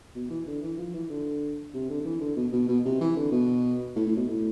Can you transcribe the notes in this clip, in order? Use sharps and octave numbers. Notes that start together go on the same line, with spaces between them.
B2
E3
D3
E3
F3
E3
D3
C3
D3
D3
E3
D3
B2
B2
B2
C3
E3
D3
B2
A2
A2
B2
A2